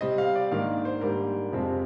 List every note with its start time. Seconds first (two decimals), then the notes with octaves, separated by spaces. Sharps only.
0.01 C3 G3 C4 D#5
0.18 F5
0.35 D5
0.51 G#2 D#3 A#3 D4 F5
0.85 C5
1.01 G#2 G3 A#3 D4 A#4
1.52 F2 C3 F3 G#3 C4